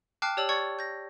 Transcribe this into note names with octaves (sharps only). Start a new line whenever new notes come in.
G5 A5 D6 F6 F#6 C7
G4 C#5 D5 A5 E6 F#7
D5 C#6 G#6 A6 C#7
G6 A#6